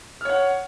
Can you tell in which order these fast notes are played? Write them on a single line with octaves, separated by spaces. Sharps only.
F6 C#5 F#5